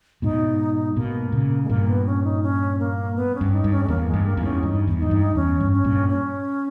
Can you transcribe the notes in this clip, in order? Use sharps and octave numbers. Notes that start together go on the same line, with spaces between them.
G#2 B2 D#4
G#2 B2 A#3
A#2 C#3
G#3
G2 A#2 A#3
B3
C#4
D#4
C#4
A#3
B3
C#4
G2
D#4
G2
C#4
G#3
E2 A#3
G#3
G2
A#3
E2 G#2
C#4
G2 D#4
E2
G#2 D#4
G2
D#4
E2 C#4
G2
C#4
G2 A#2
C#4